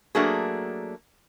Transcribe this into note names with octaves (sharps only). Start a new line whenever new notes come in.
F#3 A3 A#3 D4 F#4 G#4